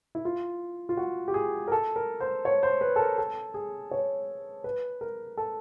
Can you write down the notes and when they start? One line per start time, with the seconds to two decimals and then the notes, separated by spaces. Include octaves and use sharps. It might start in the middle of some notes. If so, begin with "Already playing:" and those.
0.15 E4
0.25 F4
0.89 F4
0.97 F#4
1.28 G4
1.34 G#4
1.68 A#4
1.72 A4
1.96 A#4
2.20 C5
2.45 C#5
2.63 C5
2.81 B4
2.96 A4
2.99 A#4
3.18 A4
3.54 G#4
3.91 C#5
4.64 B4
5.01 A#4
5.37 A4